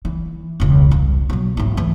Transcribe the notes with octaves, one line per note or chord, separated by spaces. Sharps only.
E3
E1 C#2
C2
B2 F#3
G#1 E4
E3 A3